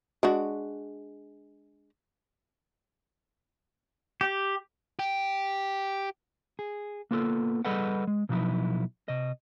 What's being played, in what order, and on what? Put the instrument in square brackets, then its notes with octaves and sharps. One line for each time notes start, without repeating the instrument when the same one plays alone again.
[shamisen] G#3 D4 F#4
[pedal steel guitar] G4
[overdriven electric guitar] G4
[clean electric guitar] G#4
A#3 B3 F4 F#4 A4
G3 G#4 A4 B4 D#5 F#5
G#3
B2 F3 F#3 D#4 E4
C3 D#5